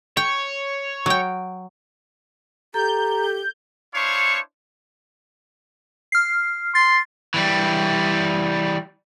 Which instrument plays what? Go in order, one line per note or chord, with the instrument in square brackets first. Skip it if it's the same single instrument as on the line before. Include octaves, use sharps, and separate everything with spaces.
[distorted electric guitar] C#5 [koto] G5
[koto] F#3 G5
[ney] G4 [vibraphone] A4 [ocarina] A#5 [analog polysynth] G6
[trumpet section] D4 E4 C5 C#5 F5 C#6
[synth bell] F6 C7
[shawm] C6 [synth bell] A6
[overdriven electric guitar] E3 G3